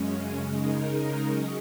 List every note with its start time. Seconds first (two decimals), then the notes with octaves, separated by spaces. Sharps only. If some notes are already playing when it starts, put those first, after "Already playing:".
Already playing: F#2 C#3 G#3 C#4
0.46 C#3 G#3 D#4 A#4
1.28 F#3 C#4 G#4 D#5